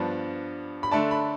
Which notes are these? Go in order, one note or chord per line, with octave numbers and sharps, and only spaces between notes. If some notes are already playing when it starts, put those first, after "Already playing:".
Already playing: G2 F3 B3 D4 A5
B5
D3 A3 D4 A5
B5